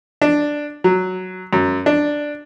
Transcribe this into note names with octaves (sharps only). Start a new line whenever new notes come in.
D4
F#3
F#2
D4